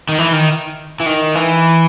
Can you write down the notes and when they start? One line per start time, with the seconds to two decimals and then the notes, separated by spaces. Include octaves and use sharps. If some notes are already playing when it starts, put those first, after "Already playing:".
0.09 D#3
0.18 E3
0.33 D#3
1.00 E3
1.06 D#3
1.35 E3